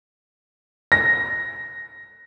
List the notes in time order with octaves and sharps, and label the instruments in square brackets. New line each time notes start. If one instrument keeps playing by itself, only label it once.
[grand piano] A#6